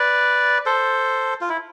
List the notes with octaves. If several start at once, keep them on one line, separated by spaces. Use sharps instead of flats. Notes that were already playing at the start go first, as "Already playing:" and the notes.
Already playing: B4 D5
A4 C5
F4
E4